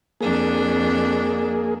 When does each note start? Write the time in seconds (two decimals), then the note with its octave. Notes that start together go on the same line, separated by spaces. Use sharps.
0.21 F2 A#3 D4 G#4